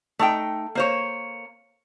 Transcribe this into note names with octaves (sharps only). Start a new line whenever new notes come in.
A3 D#4 G5
A#3 C5 C#5